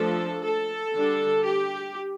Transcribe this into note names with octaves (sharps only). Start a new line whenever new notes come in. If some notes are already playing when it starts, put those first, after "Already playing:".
Already playing: F3 A3 D4 A4
A4
D3 G3 D4
G4